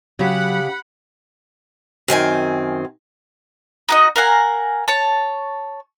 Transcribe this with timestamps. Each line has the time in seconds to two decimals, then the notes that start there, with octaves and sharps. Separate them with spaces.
0.19 C#3 F#3 G4 F#5 B5
2.08 F#2 D#3 C4 G#5
3.89 D#4 F#4 D#5
4.16 A#4 F5 F#5 G#5
4.88 C#5 A5